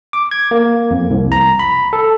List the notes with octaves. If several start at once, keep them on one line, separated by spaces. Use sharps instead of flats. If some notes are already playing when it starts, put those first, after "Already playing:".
D6
G#6
A#3
F2
C2
A#5
B5
A4